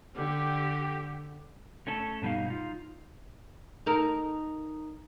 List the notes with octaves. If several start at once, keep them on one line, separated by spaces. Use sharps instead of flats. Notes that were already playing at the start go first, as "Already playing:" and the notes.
D3 G4
A3 C#4 A4
G2 B2 G3 D#4 F5
D#4 F4
D#4 A4 A#4